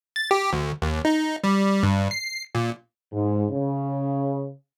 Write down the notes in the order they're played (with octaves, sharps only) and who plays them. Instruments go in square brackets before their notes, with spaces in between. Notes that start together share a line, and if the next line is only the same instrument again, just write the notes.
[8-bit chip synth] A6
G4
D2
D#2
D#4
G3
G2
C7
A#2
[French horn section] G#2
C#3